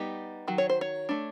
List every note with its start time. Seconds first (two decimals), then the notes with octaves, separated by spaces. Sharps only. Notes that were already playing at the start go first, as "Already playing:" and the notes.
Already playing: G3 B3 D#4 G4
0.48 D#3 F#3
0.58 C#5
0.69 C5
0.81 C#5
1.09 A3 D4